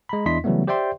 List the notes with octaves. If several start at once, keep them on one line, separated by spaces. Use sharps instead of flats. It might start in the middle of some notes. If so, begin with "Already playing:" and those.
G#3 A#5 B5
E2 D4 E4 D#5 C6 B6
C#3 E3 F#3 G3 A3 B3
G4 C5 D5 E5 G5 C6